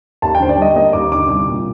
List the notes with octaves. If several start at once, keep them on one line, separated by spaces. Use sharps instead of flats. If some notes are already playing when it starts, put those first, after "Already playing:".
D#2 A5
G5
D3 C5
D5
G3 D#5
A#3 D#5
D#2 D6
D3 D6
C2 D6
A#2